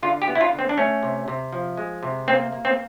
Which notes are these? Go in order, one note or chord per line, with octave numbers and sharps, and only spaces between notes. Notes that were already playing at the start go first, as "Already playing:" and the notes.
D3 F4
G4
B3
E4
F4
D3
C4
D4
A3 C#4
C3
C3
F3
G#3
C3
A#3 C4
A#3
C4